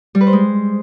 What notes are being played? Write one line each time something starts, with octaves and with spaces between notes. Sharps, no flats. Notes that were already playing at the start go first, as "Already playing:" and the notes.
G3
B4
C5
G#3